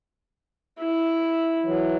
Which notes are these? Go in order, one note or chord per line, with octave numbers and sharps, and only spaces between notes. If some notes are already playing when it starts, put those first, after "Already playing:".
E4
E3 F#3